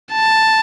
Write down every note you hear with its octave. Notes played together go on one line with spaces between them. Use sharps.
A5